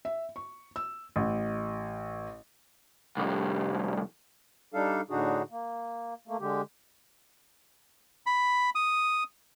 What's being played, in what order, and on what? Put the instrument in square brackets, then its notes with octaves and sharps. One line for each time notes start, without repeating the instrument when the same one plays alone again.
[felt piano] E5
C#6
E6
A1
[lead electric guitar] C2 F2
[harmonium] G3 D4 D#4 A4 F5
A2 D3 D4 D#4 F#4 G#4
A#3
A3 A#3
D3 G#3 G4
[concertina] B5
D#6